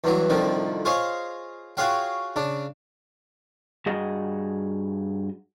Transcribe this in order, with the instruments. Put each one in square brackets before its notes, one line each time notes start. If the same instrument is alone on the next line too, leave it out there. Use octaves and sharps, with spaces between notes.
[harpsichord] E2 G2 E3 F#3
C2 F2 D3 D#3 F3
F4 G#4 C5 C#5 D#5 F5
F4 F#4 G#4 C#5 F5 G5
C#3 D4
[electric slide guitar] G2 F#4 G#4 D#5 F#5